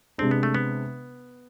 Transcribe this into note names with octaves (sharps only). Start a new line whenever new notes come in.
C3 G#3 C4 D4
B3
A3
B3